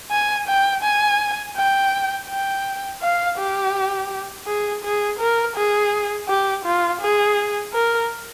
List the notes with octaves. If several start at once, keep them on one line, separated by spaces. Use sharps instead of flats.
G#5
G5
G#5
G5
G5
F5
G4
G#4
G#4
A#4
G#4
G4
F4
G#4
A#4